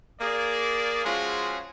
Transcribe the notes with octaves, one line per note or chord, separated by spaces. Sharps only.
A#3 G#4 D5
F3 G#3 C#4 F4 F#4 G#4